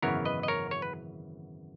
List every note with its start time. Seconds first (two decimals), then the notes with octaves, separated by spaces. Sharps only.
0.02 G#1 F#2 C#3 E3 B3 A#4 C#5
0.25 B4 D#5
0.43 D#5
0.48 A#4 C#5
0.71 C#5
0.82 B4